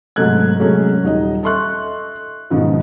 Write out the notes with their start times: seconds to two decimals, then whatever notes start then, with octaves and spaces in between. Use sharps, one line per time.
0.16 G#2 C3 F#3 A3 F#6 G#6
0.59 C3 F#3 G#3 A3 C#4
1.03 D#1 D#4 D#5
1.43 A4 D#5 E5 C6 C#6 F#6
2.50 G#2 B2 D#3 F3